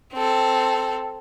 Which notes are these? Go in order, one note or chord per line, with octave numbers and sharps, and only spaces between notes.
C4 A4